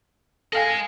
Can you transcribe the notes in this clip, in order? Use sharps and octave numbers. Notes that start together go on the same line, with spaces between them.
G#4 A4 D#5 F5 G#5